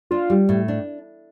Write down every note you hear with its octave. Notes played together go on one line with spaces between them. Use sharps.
D4 F4
G3
A2
D4